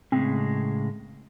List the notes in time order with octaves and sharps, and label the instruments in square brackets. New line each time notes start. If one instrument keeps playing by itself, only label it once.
[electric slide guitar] A2 C#3 G#3 [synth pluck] C4